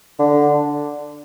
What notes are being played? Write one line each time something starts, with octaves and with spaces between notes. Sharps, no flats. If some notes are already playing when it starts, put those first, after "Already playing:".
D3